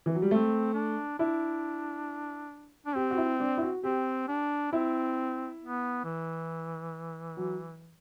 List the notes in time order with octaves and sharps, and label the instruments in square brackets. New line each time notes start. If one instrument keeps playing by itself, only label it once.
[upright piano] E3
F#3
G3
[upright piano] A3 [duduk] C4
[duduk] D4
[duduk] D4 [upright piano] E4
[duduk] D4
[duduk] C4 [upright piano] G4
[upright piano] F#4
E4
D4
E4
F#4
[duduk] C4 [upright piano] G4
[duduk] D4
[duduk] C4 [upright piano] E4
[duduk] B3
E3
[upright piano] F#3